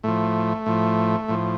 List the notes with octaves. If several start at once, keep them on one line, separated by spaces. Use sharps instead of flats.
A2 F3 A3
A2 F3
A2 F3